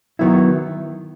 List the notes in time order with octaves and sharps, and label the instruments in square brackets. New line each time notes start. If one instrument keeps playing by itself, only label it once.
[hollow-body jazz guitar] D#3 F#3 B3 E4